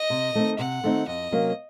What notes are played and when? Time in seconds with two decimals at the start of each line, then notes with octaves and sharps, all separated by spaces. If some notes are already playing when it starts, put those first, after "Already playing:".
Already playing: D#5
0.10 C3
0.34 D#3 A3 C4 D#4
0.59 C3 F#5
0.83 D#3 A3 C4 D#4
1.08 F2 D#5
1.31 C3 F#3 A#3 C#4